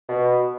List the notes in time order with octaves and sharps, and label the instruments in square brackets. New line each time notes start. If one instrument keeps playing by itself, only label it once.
[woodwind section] B2